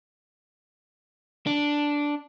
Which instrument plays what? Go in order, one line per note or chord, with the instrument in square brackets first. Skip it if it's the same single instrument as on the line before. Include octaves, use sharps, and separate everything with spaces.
[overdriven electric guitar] D4